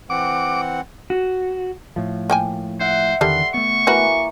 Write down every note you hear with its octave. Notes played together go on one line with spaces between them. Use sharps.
E3 C4 F#5 D6
F#4
A2 F3
A#3 G5 G#5
C5 E5 F#5
E2 D3 D#3 G3 A4 C6
A3 B3 C#6
E3 A#3 F#4 A#4 B4